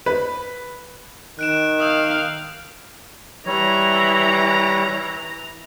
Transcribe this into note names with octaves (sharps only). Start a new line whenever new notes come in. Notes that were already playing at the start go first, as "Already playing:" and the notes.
B4
D#3 F#6 D7 E7
F5 D#6 E6 G6
E3 G3 C#5 A#5